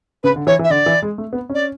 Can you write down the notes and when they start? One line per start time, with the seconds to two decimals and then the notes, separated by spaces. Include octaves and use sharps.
0.23 C#3 B4
0.36 D3
0.47 E3 C#5
0.59 E3
0.64 E5
0.70 D3 D5
0.86 E3
1.02 G#3
1.18 A3
1.33 B3
1.50 C#4 D5